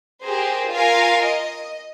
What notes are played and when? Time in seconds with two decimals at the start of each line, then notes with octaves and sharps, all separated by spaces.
0.22 G4 G#4 A#4 C5
0.71 F4 A#4 F5 G#5
1.22 D#5